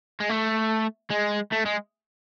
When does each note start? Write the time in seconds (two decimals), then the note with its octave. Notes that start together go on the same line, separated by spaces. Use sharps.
0.21 G#3
0.30 A3
1.10 G#3
1.52 A3
1.65 G#3